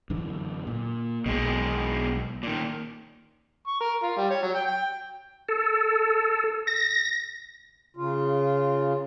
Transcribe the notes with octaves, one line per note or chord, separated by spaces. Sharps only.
F#2 D3 E3
A#2
B1 B2 G#3
A#2 D#3
C#6
A#4
F4
G3
C#5
F#3
G5
G5
A4
A#6
C#3 F4